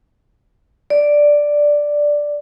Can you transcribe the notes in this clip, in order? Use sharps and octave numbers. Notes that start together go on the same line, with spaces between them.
D5